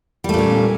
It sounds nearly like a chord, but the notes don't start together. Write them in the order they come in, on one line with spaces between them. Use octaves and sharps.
G3 A3 A#2 C#4